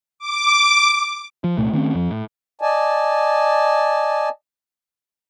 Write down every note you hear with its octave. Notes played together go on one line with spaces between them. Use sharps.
D6
F3
C2 A#2 A3
D#3 A3 C4 C#4
F2 F3
A2
D5 D#5 G#5 A5